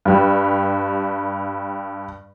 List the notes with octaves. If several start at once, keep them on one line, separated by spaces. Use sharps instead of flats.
G2 G3